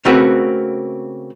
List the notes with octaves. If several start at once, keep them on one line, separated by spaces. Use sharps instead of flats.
C#3 A3 A#3 C4 F#4 B4